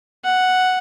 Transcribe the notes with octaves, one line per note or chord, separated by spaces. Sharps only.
F#5